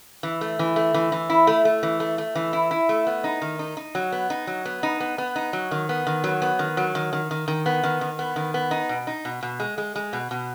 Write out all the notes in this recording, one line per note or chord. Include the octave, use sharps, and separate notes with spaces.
E3
A3
E3
A3
E3
E3
E4
A3
A3
E3
A3
A3
E3
E4
E4
A3
B3
D#4
D#3
D#4
D#4
F#3
B3
D#4
F#3
B3
D#4
B3
B3
D#4
F#3
D#3
B3
D#3
F#3
B3
D#3
F#3
D#3
D#3
D#3
D#3
B3
D#3
D#3
B3
D#3
B3
D#4
B2
D#4
B2
B2
G#3
G#3
G#3
B2
B2